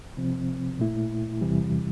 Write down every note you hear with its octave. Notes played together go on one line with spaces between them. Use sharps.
C3 F3 C4
A#2 A3 E4
E2 C3 E3 G3